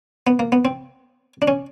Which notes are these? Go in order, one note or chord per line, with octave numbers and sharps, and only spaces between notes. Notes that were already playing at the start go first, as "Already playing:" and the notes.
B3
A#3
B3
C4
D4
C#4